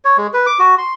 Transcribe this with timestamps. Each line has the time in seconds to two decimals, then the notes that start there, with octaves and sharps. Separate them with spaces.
0.05 C#5
0.17 G#3
0.34 B4
0.46 D6
0.59 F#4
0.78 C6